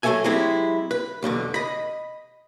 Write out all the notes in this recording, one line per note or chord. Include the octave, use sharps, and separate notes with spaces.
F#3 A3 C#4 A4 E5 G#5
F#3 G#3 C4 E4 G4
B4
B1 E2 B2 D3
D#5 B5